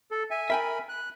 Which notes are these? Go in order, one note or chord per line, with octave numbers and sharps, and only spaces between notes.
A4
E5 G#5
A#4 E5 G5 G#5 B5
F#6